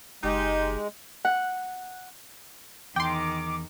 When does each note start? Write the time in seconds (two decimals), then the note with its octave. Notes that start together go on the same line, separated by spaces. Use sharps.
0.24 F#1 G#3 D#4 G4
1.25 F#5
2.96 E2 D#3 G5 C6 D6